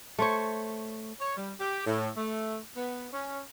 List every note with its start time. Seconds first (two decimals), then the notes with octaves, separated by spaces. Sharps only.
0.19 A3 C5 C#5
1.20 C#5
1.37 G3
1.60 G4
1.86 A2
2.17 A3
2.76 B3
3.12 C#4